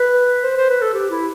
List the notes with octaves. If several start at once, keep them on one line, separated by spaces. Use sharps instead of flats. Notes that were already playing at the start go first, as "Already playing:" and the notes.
Already playing: B4
C5
C5
B4
A4
G4
E4